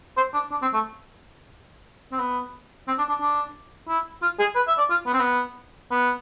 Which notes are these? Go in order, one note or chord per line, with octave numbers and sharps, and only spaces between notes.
C5
D4
D4
C4
A3
C4
B3
C4
D4
D4
D4
E4
F4
G#4
B4
E5
D5
F4
B3
C4
B3
B3